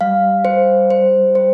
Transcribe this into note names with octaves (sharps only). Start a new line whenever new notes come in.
G3 F5
C5
C5
C5